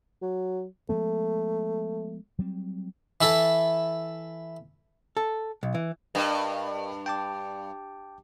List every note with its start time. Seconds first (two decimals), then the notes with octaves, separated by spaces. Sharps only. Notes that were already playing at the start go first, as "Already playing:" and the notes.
0.22 F#3
0.89 F3 G#3 A3 B3
2.39 F#3 G3 C4
3.21 E3 E4 A4
5.17 A4
5.63 B1
5.74 E3
6.15 G2 A#4 D#5 G5
7.06 G5 A5 D6